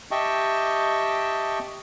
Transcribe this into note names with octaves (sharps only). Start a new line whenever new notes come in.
G4 D#5 E5 G5 A5 C#6